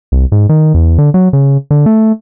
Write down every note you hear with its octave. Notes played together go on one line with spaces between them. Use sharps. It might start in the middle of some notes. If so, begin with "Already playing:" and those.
C2
G#2
D#3
E2
D3
F#3
C#3
D3
A3